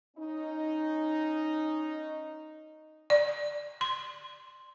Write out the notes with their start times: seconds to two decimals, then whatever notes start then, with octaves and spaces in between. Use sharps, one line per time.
0.17 C#4 D#4
3.10 D5
3.81 C6